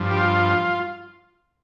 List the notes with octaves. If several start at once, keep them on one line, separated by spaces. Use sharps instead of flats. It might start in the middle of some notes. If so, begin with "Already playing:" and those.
Already playing: G2 F3
G4
F4